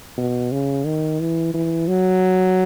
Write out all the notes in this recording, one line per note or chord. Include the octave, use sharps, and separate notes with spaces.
B2
C#3
D#3
E3
E3
F#3